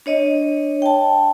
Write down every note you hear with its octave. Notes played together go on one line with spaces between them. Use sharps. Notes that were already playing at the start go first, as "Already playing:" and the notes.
D4 C#5 D#5
G5 A5